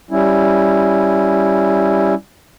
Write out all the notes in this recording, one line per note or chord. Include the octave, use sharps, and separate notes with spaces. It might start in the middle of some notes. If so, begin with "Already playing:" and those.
G3 C#4 E4